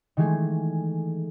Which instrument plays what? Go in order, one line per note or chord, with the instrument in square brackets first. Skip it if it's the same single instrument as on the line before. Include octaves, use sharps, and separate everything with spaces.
[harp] D#3 E3 G#3 A3 G#4